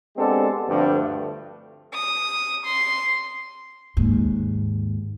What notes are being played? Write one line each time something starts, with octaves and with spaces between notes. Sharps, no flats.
G#3 B3 C4 D4 G4 A4
D2 G2 D3 F3 A3
D#6
C6
D#2 G#2